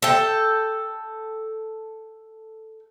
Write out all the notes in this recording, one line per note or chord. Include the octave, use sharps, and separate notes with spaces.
A4 G5